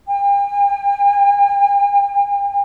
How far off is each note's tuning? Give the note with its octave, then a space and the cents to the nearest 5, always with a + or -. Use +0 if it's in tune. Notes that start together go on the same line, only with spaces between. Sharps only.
G5 +40